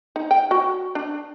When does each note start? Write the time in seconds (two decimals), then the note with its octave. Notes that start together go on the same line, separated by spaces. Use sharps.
0.16 D#4
0.31 G5
0.51 F#4
0.95 D4